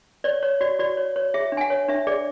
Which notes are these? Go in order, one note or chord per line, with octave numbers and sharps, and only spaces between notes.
C#5 D5
C#5
F#4 D5
F#4 D5
C#5
C#5
G#4 E5
D4
G#5
F#5
C#5
D4 E5
G#4 D5